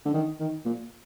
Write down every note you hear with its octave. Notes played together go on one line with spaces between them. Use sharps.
D3
D#3
D#3
A#2